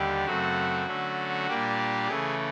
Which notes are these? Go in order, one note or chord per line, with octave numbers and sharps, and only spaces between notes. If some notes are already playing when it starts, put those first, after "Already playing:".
Already playing: D#2 D3 G3 G4
F#2 C#3 F#3 A3 C4 F#4
D3 F#3 A3 C#4
A#2 G3 A#3 D4 G4
C#3 E3 A3 G#4